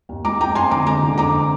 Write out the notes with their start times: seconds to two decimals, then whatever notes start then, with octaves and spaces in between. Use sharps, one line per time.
0.09 D#2
0.25 G#3 A#5 D6
0.40 F2 G5 A#5
0.55 F2 G#5 C6
0.71 D3 A#5 D6
0.86 G#3 A#5 D6
1.03 D3
1.18 F2 A#5 D6